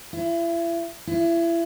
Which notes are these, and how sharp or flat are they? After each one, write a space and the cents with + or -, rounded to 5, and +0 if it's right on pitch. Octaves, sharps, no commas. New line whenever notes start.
E4 +35
E4 +30